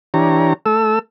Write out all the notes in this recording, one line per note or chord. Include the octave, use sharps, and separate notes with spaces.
E3 D4 G4 C#5 A#5
A3 A4 E6